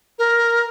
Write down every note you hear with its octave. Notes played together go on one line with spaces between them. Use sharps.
A#4